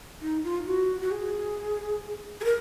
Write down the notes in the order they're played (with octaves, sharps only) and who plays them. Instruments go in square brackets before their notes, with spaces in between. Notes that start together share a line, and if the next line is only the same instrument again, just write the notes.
[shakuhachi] D#4
F4
F#4
F#4
G#4
G#4
A#4